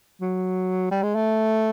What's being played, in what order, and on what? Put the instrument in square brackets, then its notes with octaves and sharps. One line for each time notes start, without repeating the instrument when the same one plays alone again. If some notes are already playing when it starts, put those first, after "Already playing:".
[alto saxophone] F#3
G3
G#3
A3